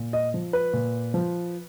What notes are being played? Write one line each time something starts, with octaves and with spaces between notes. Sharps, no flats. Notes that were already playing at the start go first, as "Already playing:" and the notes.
Already playing: A#2
D#5
F3
B4
A#2
F3